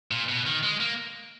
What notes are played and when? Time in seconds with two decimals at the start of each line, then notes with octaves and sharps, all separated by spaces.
0.11 A#2
0.29 B2
0.46 D#3
0.63 G#3
0.80 A#3